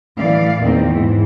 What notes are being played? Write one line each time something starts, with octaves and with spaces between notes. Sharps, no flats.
A2 E3 D5 F5
E2 A#2 D#3 C4
G#2 E3